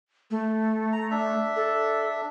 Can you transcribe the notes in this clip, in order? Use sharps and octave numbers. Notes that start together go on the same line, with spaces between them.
A3
A#5
D4 E5
A4